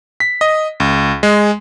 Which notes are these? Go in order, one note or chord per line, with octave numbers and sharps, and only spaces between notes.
B6
D#5
C#2
G#3